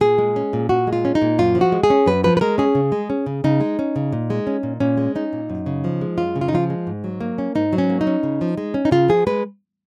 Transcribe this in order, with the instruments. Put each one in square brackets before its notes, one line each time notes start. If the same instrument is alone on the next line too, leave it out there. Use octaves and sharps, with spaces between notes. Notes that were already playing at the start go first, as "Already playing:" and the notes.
[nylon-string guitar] A#2 G#4
G#3
C#4
A#2
A#2 F#4
G#3
F4
C#4
D#4
A#2
F#2 F4
F3
F#4
G#3
G#4
C#4
F#2 B4
F3 B4
B4
G#3 A#4
C#4 G#4
C#3
G#3
C#4
C#3
C#3 D#4
G#3
C#4
C#3
A#2
G#3
C#4
A#2
A#2 C#4
G#3
C#4 D#4
A#2
F#2
C#3
F3
G#3
F#2 F4
C#3
F4
D#4
F3 F4
G#3
G#2
F#3
A#3
C#4
G#2 D#4
F#3
C#4
A#3
D#4
C#4
C#3
F3
G#3
C#4
D#4
C#3 F4
F3 G#4
G#3 B4